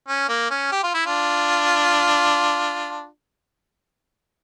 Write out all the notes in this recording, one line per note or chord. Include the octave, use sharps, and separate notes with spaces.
C#4
A#3
C#4
G4
F4
E4
D4 F4